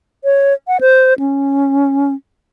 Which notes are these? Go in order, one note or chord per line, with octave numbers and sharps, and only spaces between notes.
C#5
F#5
C5
C#4